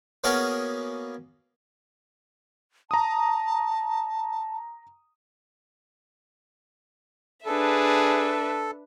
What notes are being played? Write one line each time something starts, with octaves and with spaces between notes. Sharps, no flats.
A#3 B3 C#4 F#4 G#4 A#4
A5 A#5 D#6
D4 G#4 A4 B4 E5